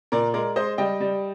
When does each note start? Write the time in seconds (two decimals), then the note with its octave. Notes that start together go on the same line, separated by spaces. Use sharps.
0.12 A#2 A#4 D5
0.34 G#3 A#4 D5
0.56 G#3 C5 D#5
0.78 G3 D#5 G5
1.01 G3